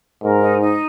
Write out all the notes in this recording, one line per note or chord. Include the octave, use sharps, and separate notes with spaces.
G#2 A#4
D#4
D#4